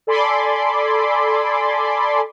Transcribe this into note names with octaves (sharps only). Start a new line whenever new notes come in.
A4 D5 G#5 B5 C6 D6